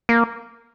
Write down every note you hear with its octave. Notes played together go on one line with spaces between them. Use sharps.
A#3